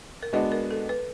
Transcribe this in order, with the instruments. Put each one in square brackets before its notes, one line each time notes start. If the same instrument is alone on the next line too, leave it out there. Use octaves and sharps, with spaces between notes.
[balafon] A#4
[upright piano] G#3 B3 D4 F#4 [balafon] B4
[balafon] A#4
A4
B4